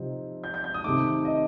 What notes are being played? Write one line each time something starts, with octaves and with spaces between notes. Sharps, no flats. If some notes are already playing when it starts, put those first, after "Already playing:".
Already playing: C3 F3 C4 D#4
G6
G6
G6
D#6
C3 D#3 A3 D#4 D6
D#5